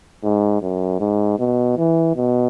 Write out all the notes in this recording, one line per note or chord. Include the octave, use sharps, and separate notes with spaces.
G#2
F#2
G#2
B2
E3
B2